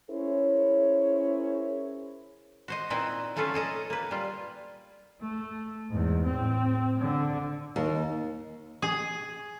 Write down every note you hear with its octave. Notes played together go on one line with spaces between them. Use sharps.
C#4 E4 G#4 A#4 C5 C#5
F#4 C5 D#5
A#2 C4 D#4 E4 B4
F#3 A3 C#4 F4 A4 B4
G#4 A4 D#5 A#5
A#3 B4
G3 F4
A3
E2 G#2
A2 C4
D3
D#2
G#4